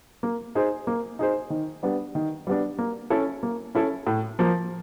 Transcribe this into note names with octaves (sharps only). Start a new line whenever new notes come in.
A#3
D#4 G#4 C5
A#3
D#4 G#4 C5
D#3
G3 B3 D4
D#3
G3 B3 D4
A#3
C#4 E4 A4
A#3
C#4 E4 A4
A2
F3 A#3